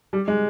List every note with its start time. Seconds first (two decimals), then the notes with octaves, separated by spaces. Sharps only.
0.13 G3
0.28 G#3